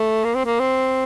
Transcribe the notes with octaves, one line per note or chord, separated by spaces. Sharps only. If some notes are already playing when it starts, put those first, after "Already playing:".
Already playing: A3
A#3
C4
A#3
C4